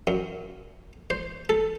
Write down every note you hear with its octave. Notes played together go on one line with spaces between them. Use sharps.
F#2
C5
A4